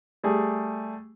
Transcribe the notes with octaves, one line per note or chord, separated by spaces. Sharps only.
G3 A3 G#4